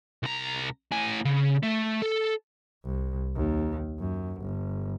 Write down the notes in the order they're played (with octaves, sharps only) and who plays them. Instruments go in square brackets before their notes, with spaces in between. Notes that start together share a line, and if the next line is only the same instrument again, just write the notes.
[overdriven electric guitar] C2 A#5
A2 G#5
C#3
A3
A4
[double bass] C2
D#2
F#2
G1